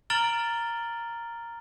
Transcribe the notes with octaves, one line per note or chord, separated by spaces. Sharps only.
A#5 F6 A6 D7 F#7 G7